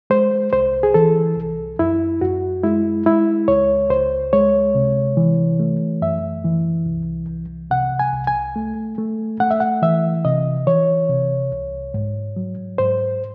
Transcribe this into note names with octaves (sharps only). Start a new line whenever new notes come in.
G#3 C5
C2 C5
G#4
E3 A4
C2
F#2 E4
F#2 F#4
G#3 E4
G#3 E4
C#2 C#5
C#2 C5
G#3 C#5
C3
E3
A3
F#2 E5
E3
C2
C2
C3 F#5
G#5
C2
G#5
A3
A3
A3 F#5
E5
F#5
E3 E5
C3 D#5
E3 C#5
C3
C2
G#2
F#3
G#2 C5